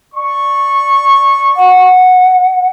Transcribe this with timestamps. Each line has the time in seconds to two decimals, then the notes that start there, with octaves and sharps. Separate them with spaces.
0.15 D5 C#6
1.56 F#5